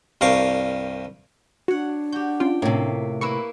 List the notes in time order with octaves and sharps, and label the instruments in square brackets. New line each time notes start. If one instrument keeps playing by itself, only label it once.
[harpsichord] C2 G2 A#4 F5 C#6
[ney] D4 [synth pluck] F#4 [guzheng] C#5 F#5
[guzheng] F#4 G4 [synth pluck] G6
[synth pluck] C#4 F4 [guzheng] G5
[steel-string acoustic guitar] A2 C3 [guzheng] A#3
[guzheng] A#3 E4 B4 [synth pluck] C#6 E6